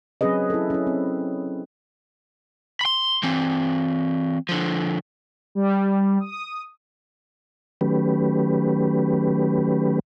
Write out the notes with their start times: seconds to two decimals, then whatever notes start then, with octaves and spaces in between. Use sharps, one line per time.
0.21 F#3 C4 C#4 G#4 B4 D#5
0.50 E4 A4
0.70 C#4 E4
0.87 C4
2.81 B5 C6
3.23 E3 C4
4.49 D3 F3
5.55 G3
6.20 D#6
7.81 D#3 F#3 A3 C#4 G4 B4